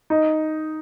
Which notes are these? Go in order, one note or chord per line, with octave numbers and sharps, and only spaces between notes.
D#4